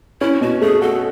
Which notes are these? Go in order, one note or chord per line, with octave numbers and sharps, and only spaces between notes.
C#4 E4
B2 F#4
A3 G#4
F#4 A4